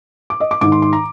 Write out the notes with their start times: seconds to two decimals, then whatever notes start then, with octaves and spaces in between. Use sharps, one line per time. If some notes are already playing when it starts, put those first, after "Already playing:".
0.30 D6
0.40 D#5
0.51 D6
0.61 G#2 D#3 D6
0.72 C6
0.82 C6
0.93 A#5